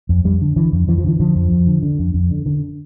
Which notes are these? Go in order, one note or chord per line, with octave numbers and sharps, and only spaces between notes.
F2
F2 G3
D3
D3 E3
F2
F2 E3
F3
D3 E3
D3 F3
F2
F2
D3
D3
F2
F2
D3
D3